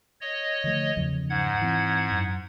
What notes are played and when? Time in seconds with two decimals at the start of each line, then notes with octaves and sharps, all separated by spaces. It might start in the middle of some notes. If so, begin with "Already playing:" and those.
0.21 C#5 D#5
0.64 D3 F3 A3
0.97 E2 C#3 F3
1.30 G#2 F#5 G#6
1.61 E3 C4
2.11 F#2